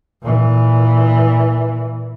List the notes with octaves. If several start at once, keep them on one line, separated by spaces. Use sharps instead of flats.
A#2 E3